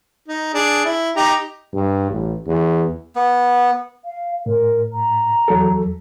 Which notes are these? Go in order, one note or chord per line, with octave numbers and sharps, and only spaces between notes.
D#4
D4 G#4
E4
D#4 G4 A#5
G2
A1
E2
B3
F5
A2 A#4
A#5
E2 F#3 A4